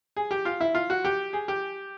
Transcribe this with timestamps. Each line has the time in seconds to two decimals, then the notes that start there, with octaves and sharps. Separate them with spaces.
0.16 G#4
0.31 G4
0.45 F4
0.60 E4
0.75 F4
0.90 F#4
1.05 G4
1.33 G#4
1.48 G4